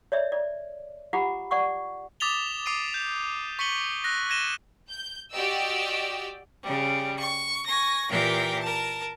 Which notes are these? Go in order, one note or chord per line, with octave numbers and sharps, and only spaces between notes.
C#5 D5 E5
D5
F4 G4 F#5 A#5 B5 D6
D5 F#5 C#6 D6
D6 D#6 A6 B6 F7 G7
D6 D#6 C7 D7 D#7
G6
C#6 B6 C#7 D#7 F#7 G7
E6 F#6 A#6
G#6 A#6 D#7 E7 G7
G6
F#4 G4 D5 D#5 G5 E6
C#3 G3
C#6
G#5 C#6 A#6
A#2 E3 G4 A#4 G5
A#4 A5